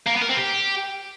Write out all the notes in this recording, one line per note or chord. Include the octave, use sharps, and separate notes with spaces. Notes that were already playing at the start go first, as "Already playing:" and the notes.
A#3
B3
A#4
C4
G4